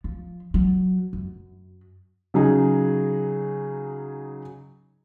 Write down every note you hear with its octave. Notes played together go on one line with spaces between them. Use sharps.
F3
F#3
F#2
C#3 F#3 D#4 G#4